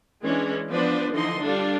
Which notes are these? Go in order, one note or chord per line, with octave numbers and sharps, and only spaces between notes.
E3 G#3 C#4 D4
F3 B3 D4 B4 C5 D5
D3 E3 F3 D#4 D#5 C6
G3 D4 F4 A4